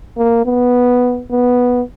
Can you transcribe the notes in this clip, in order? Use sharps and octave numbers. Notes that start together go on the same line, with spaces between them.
A#3
B3
B3